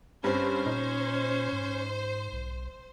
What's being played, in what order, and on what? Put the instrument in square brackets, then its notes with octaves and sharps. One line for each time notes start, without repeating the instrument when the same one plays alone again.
[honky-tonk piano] G2 C4 [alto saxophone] C#4 [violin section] C5
[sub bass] A#2 [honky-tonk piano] D#4
[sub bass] G#2
B1